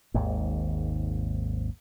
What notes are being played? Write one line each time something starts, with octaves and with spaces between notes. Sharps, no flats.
G#1 D#2 G#2